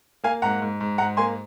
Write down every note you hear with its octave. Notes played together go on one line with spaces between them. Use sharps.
A#3 F5 G#5
G#2 F#5 A#5
G#2
G#2
G#2 F#5 A#5
A#3 G#5 C6